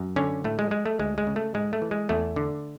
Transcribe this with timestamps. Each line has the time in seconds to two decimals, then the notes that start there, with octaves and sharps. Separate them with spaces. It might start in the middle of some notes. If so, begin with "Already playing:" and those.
Already playing: F#2
0.16 D3 C#4
0.44 A2 A3
0.59 G#3
0.71 G#3
0.86 A3
0.99 D2 G#3
1.18 G#3
1.27 C#3
1.36 A3
1.54 G#2 G#3
1.73 A3
1.82 E3
1.91 G#3
2.09 E2 A3
2.36 D3